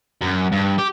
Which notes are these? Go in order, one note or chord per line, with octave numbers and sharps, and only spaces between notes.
F#2
G2
G4